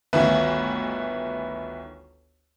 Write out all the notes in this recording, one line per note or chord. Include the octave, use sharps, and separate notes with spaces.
G1 D2 D#3 B3 B4 E5